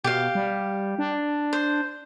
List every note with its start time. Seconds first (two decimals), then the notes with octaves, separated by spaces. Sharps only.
0.04 B2 G4 F5
0.35 G3
0.99 D4
1.53 C5